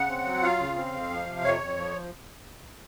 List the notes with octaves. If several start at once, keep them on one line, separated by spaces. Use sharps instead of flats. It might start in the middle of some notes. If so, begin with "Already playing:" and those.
Already playing: C#3 F#5
C4
F#3
F4 F5
C#3
C4
F2
F3
C3
F2 C#5
F2
F3